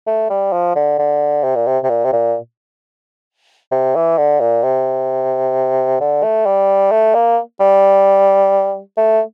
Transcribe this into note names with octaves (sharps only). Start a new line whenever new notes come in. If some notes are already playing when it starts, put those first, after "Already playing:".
A3
G3
F3
D3
D3
C3
A#2
C3
C3
A#2
C3
A#2
C3
E3
D3
A#2
C3
D3
A3
G3
A3
A#3
G3
A3